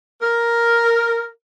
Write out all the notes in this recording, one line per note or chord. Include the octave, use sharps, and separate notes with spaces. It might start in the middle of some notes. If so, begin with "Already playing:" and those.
A#4